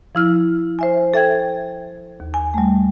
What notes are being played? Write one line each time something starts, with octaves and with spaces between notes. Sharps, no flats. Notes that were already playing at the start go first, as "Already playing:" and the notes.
F3 E4 F6
C5 E5 G#5
A4 E5 G5 G#6
D#2
G#5
G3 A3